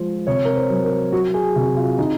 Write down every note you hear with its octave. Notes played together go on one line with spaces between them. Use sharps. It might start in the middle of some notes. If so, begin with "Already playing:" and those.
Already playing: F3 G#3 C5
C3 C#5
A#4
C5
F#3
A#4
F#3 F#4
G#4
C3 F#4
F4
C3 D#4